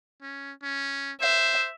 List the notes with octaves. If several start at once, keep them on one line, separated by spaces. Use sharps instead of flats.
C#4
C#4
C5 E5